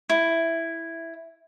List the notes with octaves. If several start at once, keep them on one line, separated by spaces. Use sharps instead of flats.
E4